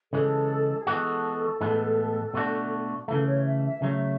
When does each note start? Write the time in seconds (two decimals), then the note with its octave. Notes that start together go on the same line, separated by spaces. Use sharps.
0.13 C#3 E3 G#3 A4
0.79 G#4
0.86 E3 G#3 B3 F#4 A4
1.61 A2 E3 G#3 B3
2.34 B2 A3 D4 F#4
3.08 C#3 E3 A3 A4
3.26 C#5
3.45 E5
3.63 E5
3.82 C#3 F#3 A3 E5